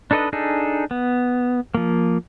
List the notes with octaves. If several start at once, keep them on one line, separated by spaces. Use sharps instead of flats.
D4 D#4 A4 B4 D#5
D4 D#4 G#4 A4
B3
F3 A#3